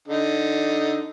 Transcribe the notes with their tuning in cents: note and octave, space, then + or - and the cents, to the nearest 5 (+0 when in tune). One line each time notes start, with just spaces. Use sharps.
D3 +0 D#4 +5